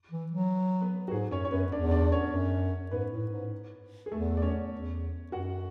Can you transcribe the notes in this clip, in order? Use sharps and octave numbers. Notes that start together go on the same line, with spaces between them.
E3
F#3
B3 B4
F#4
G#2 G#4
F#2 C#4 C#5
C#5
F#2 B3 B4
E2 D4 D5
D4 D5
C#4 C#5
F#2
G#2 B3 B4
A2
G#2
G#4
E2 A3 A4
D5
C#4 C#5
E2
F#2 F#4 F#5